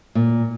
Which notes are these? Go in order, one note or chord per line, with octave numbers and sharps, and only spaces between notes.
A#2